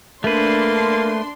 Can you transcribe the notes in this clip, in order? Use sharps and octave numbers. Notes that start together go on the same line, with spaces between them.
A3 A#3 D4 B4 C6